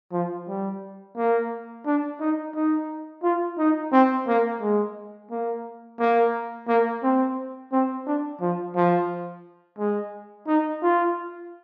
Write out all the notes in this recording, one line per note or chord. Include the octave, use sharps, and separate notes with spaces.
F3
G3
A#3
D4
D#4
D#4
F4
D#4
C4
A#3
G#3
A#3
A#3
A#3
C4
C4
D4
F3
F3
G#3
D#4
F4